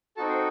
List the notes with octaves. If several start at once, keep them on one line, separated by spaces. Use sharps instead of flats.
C4 D#4 F#4 A4 A5
C5